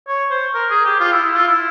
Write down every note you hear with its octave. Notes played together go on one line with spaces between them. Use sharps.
C#5
C5
A#4
G#4
G4
F4
E4
E4
F4
E4